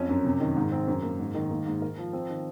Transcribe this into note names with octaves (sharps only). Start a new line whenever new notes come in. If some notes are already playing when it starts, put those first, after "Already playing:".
Already playing: F2 C#4
F#2
C3
D#3
G#2
C4
F#2
A#3
G#2
D#3
A#3
G#2
A#4
F3
C4
D#3